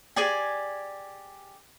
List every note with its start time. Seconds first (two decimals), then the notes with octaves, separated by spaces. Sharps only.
0.16 G4 G#4 D5 G#5